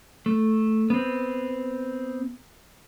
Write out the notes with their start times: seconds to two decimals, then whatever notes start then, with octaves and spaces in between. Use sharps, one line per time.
0.26 A3
0.90 B3 C4